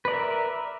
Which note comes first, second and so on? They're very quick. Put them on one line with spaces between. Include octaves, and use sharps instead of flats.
B4 D5 A#4 E5